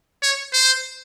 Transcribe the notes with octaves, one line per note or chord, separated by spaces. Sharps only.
C#5
C5